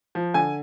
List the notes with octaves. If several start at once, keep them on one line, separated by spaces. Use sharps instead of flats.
F3
D3 G#5